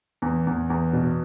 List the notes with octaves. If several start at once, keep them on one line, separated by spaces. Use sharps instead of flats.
E2
E2
E2
B2